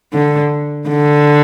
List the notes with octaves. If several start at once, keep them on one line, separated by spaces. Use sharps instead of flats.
D3
D3